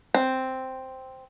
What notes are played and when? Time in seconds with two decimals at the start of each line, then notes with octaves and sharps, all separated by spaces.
0.14 C4